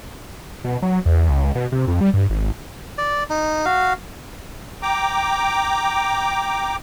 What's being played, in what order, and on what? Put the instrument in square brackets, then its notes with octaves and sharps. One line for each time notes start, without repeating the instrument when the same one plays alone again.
[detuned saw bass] B2
F#3
E2
C#2
B2
C3
F2
G3
G2
G#1
[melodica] D5
D#4
F#4 F5
[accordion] G5 A#5 D6